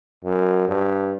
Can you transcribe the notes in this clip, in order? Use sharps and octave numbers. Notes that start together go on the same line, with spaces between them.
F#2
G2